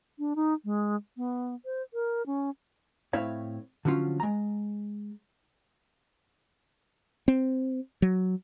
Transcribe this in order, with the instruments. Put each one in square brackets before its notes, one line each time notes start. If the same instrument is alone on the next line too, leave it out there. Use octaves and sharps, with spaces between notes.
[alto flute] D4
D#4
G#3
B3
C5
A#4
C#4
[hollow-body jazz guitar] A2 C4 E4 C#5 F5
D3 F3 F#3 C#4 F4
G#3 A#5
[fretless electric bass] C4
F#3